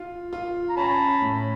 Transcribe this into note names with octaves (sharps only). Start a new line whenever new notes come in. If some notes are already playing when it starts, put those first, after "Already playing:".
Already playing: F4
F4
A#5
C#4 A5 B5
A2